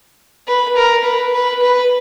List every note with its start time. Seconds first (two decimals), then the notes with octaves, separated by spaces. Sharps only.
0.47 B4
0.76 A#4
1.04 B4
1.33 B4
1.62 B4